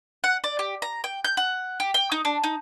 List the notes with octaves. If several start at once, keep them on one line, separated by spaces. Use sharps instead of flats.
F#5
D5
G4
A#5
G5
G6
F#5
G4
G5
D#4
D4
D#4